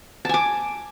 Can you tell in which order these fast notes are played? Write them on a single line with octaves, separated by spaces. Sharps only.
A5 G#5 D6